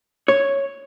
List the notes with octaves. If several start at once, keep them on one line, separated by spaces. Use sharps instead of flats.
C#5